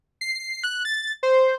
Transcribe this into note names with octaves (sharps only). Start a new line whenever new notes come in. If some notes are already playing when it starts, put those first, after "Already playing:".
C7
F#6
A6
C5